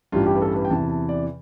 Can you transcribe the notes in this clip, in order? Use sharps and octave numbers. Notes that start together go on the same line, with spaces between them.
A1 G2 E3 G3 F4
G4
B4
A4
B4
G5
E2 C3 E3 A5
A5
D5